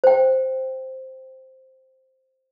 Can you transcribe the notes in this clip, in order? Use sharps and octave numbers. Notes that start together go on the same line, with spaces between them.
C5 G5